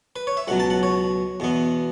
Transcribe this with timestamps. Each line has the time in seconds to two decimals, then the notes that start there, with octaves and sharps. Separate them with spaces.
0.16 B4
0.27 C#5
0.37 E5
0.48 C#2 B2 F#3 F#5
0.60 A5
0.70 F#5
0.83 C#5
1.40 E2 B2 B3